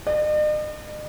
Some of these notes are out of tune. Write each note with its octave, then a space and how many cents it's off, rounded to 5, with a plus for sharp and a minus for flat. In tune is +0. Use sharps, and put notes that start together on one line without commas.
D#5 -45